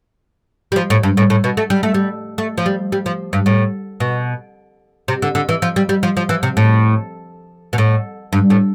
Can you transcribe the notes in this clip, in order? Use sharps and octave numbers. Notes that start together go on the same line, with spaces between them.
G3
F3
A2
G2
A2
A2
B2
A3
G3
A3
G3
A3
F3
G3
G3
F3
G2
A2
B2
C3
D3
D3
E3
F3
G3
G3
F3
F3
E3
C3
A2
B2
A2
G2
A2